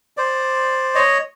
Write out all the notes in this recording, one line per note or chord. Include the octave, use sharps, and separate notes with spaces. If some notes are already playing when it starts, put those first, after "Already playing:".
C5 D5
C#5 D#5